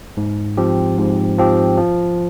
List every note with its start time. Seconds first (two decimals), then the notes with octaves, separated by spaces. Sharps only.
0.17 G#2
0.57 F3 C4 G4
0.98 G#2
1.38 F3 C4 G4
1.78 F3